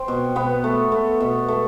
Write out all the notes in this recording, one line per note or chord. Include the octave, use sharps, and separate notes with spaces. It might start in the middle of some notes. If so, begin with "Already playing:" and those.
Already playing: C4
B2
B2 B3
A3
A3
B2
A3